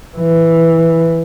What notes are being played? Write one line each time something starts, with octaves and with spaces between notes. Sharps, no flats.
E3